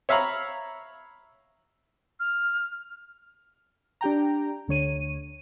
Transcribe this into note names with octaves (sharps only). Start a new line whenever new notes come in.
C#5 E5 F5 A#5 B5
F6
D4 G4 G5 A#5
D2 D3 C#5 D#7